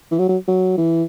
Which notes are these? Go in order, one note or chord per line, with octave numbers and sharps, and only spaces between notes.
E3
F#3
F#3
F#3
E3